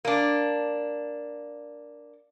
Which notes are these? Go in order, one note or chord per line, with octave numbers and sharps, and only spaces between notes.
A#3 D4